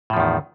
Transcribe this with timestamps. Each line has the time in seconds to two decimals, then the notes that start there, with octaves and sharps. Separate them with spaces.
0.10 A2
0.13 F3
0.17 E2
0.20 D#3